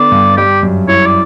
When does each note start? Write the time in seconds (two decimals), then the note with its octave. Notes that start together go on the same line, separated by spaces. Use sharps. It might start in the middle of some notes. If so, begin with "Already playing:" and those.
Already playing: D3 B3 D5
0.12 G2
0.37 G3 G4
0.63 F#2
0.88 E4 C#5
1.06 D5